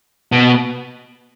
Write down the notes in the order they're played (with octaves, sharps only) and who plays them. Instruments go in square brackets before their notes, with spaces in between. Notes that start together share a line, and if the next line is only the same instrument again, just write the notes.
[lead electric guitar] B2